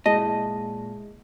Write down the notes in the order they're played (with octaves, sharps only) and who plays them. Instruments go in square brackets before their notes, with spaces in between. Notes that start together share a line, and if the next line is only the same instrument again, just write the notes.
[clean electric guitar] A#2 A5 [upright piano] G#3 E4 [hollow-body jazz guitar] D#5